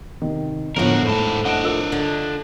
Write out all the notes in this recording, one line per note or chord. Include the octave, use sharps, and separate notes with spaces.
C3 D#3
F2 A2 D3 F3 B3 F#4 A#4
G#2 A3 A5 B5
D4 D#5 F#5 D7 E7
F4 A#4 E6
D3